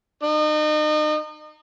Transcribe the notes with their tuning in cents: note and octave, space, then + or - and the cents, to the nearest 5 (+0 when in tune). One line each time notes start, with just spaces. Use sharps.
D#4 -35